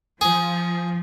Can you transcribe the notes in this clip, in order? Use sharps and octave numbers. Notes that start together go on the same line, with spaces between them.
F3 G#4